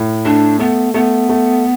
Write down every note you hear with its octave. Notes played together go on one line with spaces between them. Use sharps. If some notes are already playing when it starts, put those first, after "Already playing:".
Already playing: A2
A3 D4
A3 B3
A3 B3
A3